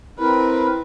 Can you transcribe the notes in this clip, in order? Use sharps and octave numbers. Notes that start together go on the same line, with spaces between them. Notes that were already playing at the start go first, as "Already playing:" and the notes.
C4 E4 A#4 B4